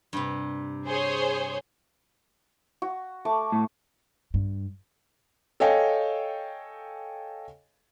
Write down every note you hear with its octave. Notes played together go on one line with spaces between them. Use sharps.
G2 C3
G#4 C5 C#5
F#4
A3 C#6 D6
A2
G2
A4 C#5 D#5 F5 G5 G#5